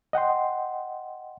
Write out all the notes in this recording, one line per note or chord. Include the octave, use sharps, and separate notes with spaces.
D#5 F#5 G5 C6